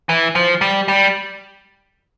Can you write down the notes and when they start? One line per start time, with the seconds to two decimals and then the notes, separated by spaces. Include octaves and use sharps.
0.09 E3
0.35 F3
0.61 G3
0.88 G3